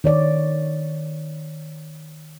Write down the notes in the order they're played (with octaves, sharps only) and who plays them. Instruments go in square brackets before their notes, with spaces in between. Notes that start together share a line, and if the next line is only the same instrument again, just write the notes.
[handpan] D#3 C#5 D5